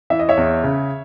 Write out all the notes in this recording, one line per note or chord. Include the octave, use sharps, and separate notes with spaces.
E3 E5
D#5
C#5 E5
E2
C#3